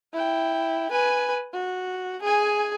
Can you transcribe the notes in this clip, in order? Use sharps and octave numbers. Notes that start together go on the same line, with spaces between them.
E4 G5
B4 G#5
F#4
G#4 G#5